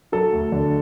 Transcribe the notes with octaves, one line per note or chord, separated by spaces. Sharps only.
F#3 A4
D2
D3